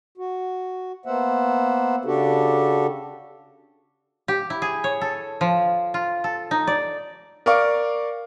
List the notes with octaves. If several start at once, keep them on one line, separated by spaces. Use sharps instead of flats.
F#4
A#3 B3 C5 E5 F#5
C#3 D4 F#4 G4 A4
G4
E4
G#4
C#5
A4
F3
F4
A4
D#4
D5
A#4 D5 F5 C#6 D6